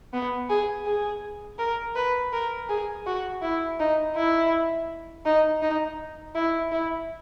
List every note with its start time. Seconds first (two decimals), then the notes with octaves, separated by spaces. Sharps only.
0.13 B3
0.49 G#4
0.86 G#4
1.59 A#4
1.96 B4
2.33 A#4
2.69 G#4
3.07 F#4
3.42 E4
3.80 D#4
4.16 E4
5.25 D#4
5.62 D#4
6.35 E4
6.72 E4